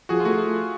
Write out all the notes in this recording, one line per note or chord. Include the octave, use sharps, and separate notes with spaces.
F3 F#4 G#4
F4
A3 E4 F#4